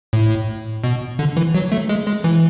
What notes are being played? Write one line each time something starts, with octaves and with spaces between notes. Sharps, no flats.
A2
B2
D3
E3
F#3
A3
G#3
G#3
E3